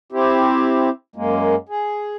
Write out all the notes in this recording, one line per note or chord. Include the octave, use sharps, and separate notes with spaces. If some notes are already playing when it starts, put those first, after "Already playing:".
C4 E4 G4
F#2 G#3 A#3
G#4